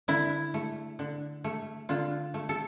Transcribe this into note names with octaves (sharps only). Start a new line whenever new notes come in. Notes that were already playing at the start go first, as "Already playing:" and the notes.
D3 E4
A3
D3
A3
D3 F4
A3
A4